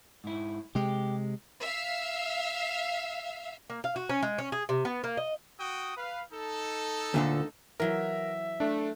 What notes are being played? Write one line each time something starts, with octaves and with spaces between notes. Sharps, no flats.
G#2 E4
C3 G#3 G4
E5 F5
A#3
F5
F#4
C#4
G#3
C#4
G#4
C3
B3
A#3
D#5
F#4 G5 D#6
B4 F5
D#4 A4
D2 A#2 D3
E3 F#3 E4 A#4 E5
A3 D4